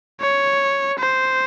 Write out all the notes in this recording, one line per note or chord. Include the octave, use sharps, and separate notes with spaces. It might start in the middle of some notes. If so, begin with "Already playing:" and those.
C#5
C5